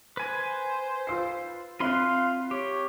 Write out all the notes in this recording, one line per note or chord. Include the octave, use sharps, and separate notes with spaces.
B4 C5 G#5
F4 E6 C7
C4 F4 E5 F5 B5 C6 F#6
G4 C#5